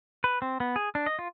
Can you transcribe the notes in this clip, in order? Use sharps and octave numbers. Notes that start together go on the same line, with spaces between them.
B4
C4
B3
G#4
D4
D#5
F4